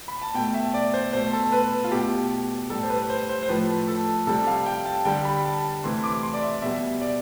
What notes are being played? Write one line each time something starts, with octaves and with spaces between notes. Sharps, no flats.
B5
A5
B2 A3 G5
E5
D5
C5
B2 A3 C5
A4
B4
A4
F4
B2 A3 G4
A2 G3 A4
C5
B4
C5
C5
C5
A2 F3 A3 B4
A4
C3 G3 A4
F5
G5
A5
D3 G3 G5
B5
A5
C3 E3 A3 C6
D6
C6
D5
E5
B2 G3 E5
D5